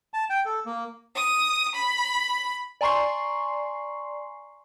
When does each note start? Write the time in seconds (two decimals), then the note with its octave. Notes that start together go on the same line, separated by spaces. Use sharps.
0.14 A5
0.30 G5
0.45 A4
0.66 A#3
1.16 D#6
1.75 B5
2.81 D5 G#5 A#5 C6 C#6 C7